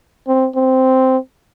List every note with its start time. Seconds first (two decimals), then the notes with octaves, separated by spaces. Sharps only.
0.27 C4
0.56 C4